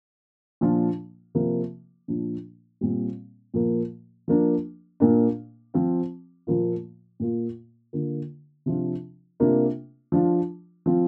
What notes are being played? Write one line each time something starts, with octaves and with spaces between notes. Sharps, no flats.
A#2 F3 D4 F4
C3 F3 A#3
A#2 F3 D4
A#2 G3 C4
A#2 F3 A#3
F3 A#3 D4
A#2 A#3 D4
F3 C4 F4
A#2 F3 A#3 F4
A#2 A#3 F4
D3 A#3 F4
C3 F3 D4 F4
C3 A#3 D4 F4
F3 D4 F4
F3 C4 F4